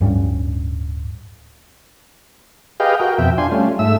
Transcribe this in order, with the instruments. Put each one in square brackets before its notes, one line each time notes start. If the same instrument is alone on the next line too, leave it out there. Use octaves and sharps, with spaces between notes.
[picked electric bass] D1 G2 G3 C#4
[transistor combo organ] G4 G#4 B4 D#5 F5 G5
F#4 A#4 G5
F2 B2 E5 G5
D4 F4 G#5 C6
G3 A3 C#4 F4
G#2 A3 E5 E6